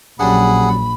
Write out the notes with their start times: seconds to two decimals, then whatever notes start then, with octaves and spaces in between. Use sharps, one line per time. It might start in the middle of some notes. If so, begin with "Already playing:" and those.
0.20 A#1 F#2 G3 D4 G#4 F#5 B5